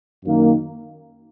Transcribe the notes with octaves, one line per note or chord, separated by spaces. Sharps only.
F#2 D#3 A#3